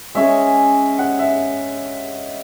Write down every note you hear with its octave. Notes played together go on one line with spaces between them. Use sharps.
G#3 C#4 G#4 E5
F#5
E5